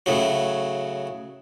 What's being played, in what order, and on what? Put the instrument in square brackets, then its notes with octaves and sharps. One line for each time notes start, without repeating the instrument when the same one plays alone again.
[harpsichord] A2 C#3 F#3